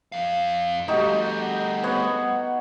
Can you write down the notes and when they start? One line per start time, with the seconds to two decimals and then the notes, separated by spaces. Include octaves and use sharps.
0.12 F2 F5
0.88 G3 A3 D#4 F#4 G4
1.84 B3 C#5 F#5